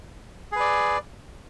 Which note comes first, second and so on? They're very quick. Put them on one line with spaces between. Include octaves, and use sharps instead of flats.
G#4 B4 D5